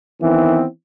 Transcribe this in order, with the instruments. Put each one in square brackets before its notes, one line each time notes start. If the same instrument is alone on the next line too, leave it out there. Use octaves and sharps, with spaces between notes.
[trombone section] D#3 E3 B3 C4